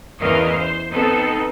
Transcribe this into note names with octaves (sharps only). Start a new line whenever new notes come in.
E2 E3 C#4 A#4 D#5 F5
C5
B3 C4 D#4 A4